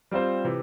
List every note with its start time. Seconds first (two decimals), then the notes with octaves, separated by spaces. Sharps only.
0.11 G3 C4 F4 C5
0.44 C3 E3